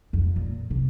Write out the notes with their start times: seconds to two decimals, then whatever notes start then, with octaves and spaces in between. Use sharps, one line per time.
0.13 F2
0.36 A#2
0.70 C3